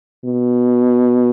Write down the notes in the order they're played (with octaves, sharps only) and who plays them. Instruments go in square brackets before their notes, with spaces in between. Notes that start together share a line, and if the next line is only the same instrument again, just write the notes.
[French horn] B2